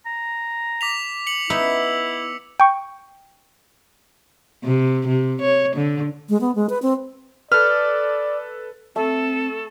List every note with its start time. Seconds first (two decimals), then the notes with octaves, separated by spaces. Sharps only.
0.06 A#5
0.81 D6 B6 F7
1.27 C#7 F#7
1.50 B3 D#4 E4 E5 E6
2.60 G5 C#6
4.64 C3
5.07 C3
5.41 C#5
5.76 D3
6.29 G#3
6.41 B3
6.55 G#3
6.69 B4
6.82 C4
7.52 A4 B4 D5 F6
8.96 A3 C4 A4